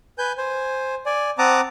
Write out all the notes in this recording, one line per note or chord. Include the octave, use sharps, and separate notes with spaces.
B4 G#5 G6
C5 G#5
D5 G#5
C4 F#5 A5 A#5 D6 D#6